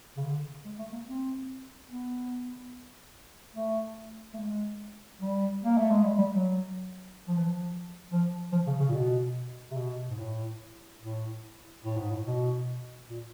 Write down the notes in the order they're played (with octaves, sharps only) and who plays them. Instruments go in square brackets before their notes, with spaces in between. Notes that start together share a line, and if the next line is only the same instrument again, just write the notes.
[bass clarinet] C#3
D3
G#3
A3
A#3
C4
B3
A3
A3
G#3
G3
A#3
A3
G#3
G3
G3
F#3
F3
E3
F3
F3
F3
C#3
C#3
A#2
B2
C3
B2
G#2
A2
A2
A2
G#2
A2
B2
A#2